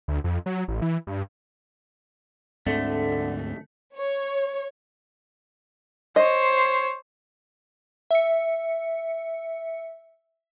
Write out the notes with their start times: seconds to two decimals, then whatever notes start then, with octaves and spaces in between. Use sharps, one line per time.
0.08 D2
0.24 F2
0.46 F#3
0.68 A1
0.82 E3
1.07 G2
2.67 D2 G#2 D3 A3 C4
3.96 C#5
6.16 C5 C#5 D#5
8.11 E5 C#7